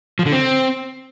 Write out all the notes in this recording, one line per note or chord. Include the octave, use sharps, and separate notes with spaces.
F3
D3
C4